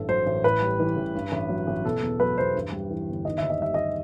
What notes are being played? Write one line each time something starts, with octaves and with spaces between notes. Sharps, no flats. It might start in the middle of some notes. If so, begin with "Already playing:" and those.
Already playing: A1 G2 A4
F#3 C5
A1
A2 B4
G3
E3
A1
G2
A1
F#3
A1
B2 A4
E2
F#3 B4
E2 C5
G2
G3
E3
G1
D#3 D#5
D#2 E5
D#5
G3 E5
D#5